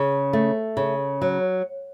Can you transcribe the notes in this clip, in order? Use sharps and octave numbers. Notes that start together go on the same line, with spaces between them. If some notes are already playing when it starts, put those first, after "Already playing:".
Already playing: C#3
A3
C#3
F#3